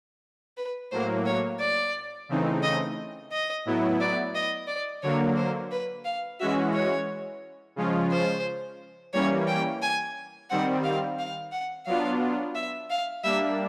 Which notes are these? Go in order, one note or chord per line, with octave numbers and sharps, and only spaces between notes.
B4
A2 F#3 A#3 C5
C#5
D5
C#3 E3 A3 C4 D#4
D#5
D#5
A2 F#3 B3 E4
D5
D#5
D5
D3 F#3 A#3 C#5
C5
B4
F5
E3 G#3 C#4 F#4 E5
C#5
C#3 F3 G#3 C#4 F4
C5
E3 G3 A#3 C#4 C#5
G5
G#5
D#3 G3 C4 F#5
F5
F5
F#5
F#3 B3 D4 F4 F5
E5
F5
G3 A#3 D4 E5